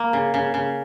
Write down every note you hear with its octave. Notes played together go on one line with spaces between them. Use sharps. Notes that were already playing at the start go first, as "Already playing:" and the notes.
Already playing: A#3
C#3
C#3
C#3